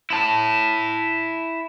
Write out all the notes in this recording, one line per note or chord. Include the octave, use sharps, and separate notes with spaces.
E4 A5